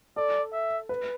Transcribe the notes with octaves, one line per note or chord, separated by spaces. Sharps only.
A4 D5
E5
B4